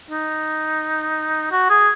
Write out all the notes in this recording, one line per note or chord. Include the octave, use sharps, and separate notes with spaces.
D#4
F#4
G#4